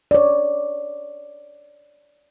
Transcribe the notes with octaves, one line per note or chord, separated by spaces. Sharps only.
C#5 D5